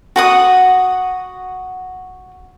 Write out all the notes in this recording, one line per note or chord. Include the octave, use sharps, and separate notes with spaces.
F#4 F#5 D#6